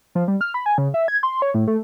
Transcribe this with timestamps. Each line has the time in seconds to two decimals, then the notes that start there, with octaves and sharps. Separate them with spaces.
0.15 F3
0.28 G3
0.41 F6
0.54 B5
0.66 G#5
0.78 C#3
0.94 E5
1.08 G#6
1.23 C6
1.42 C#5
1.54 A2
1.68 A3